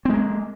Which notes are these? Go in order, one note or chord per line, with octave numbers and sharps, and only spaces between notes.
G#3 A#3 C4